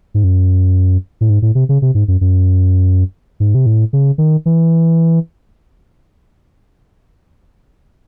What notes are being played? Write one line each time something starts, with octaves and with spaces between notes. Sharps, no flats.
G#2
F#2
A2
G#2
A2
C3
C#3
C3
G#2
F#2
F#2
G#2
C3
A2
C#3
D#3
E3